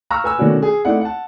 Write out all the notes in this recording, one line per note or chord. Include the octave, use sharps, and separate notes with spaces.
F5 A#5 C#6 E6 F6 A#6
B4 G#5 E6
B2 D#3 A3 C#4 D4 F#4
G#4 G#5
A3 C4 D#4 E4 D5 F#5
F#5 A5